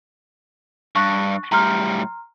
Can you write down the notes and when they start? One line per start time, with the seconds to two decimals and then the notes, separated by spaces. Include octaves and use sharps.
0.95 G2 C#6 F#6
1.52 A2 G3 A#5 C6 F6